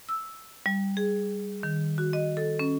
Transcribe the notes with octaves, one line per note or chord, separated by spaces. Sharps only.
E6
G3
G#4
D#3
F#4
D#5
A4
C#4